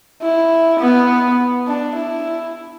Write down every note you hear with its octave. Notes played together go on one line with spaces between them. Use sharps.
E4
B3
D4
E4